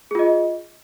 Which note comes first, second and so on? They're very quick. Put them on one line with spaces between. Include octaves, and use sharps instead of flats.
G#4 F4 D#5